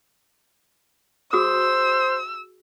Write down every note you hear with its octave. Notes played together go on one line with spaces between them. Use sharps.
F#4 G#4 C5 D#6 E6